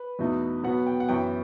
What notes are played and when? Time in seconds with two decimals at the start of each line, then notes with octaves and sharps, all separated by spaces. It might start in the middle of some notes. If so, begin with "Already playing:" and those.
Already playing: B4
0.19 E2 B2 A3 D#4
0.63 B2 F#3 B3 F#5
0.87 G5
1.00 F#5
1.09 F#2 E3 B3 G5